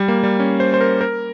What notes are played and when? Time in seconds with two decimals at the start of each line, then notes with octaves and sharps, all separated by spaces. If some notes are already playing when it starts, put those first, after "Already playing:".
Already playing: G3
0.08 A#3
0.23 G3
0.40 C#4
0.60 C5
0.74 C5
0.81 A#4
1.01 A#4